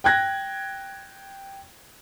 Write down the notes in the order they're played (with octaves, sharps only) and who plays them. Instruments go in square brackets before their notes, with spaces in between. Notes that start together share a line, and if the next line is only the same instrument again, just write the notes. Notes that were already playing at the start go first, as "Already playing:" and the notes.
[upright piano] G5 F#6 G#6 A#6